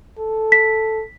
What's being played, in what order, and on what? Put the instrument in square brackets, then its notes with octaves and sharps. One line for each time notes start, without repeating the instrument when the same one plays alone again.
[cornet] A4
[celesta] B6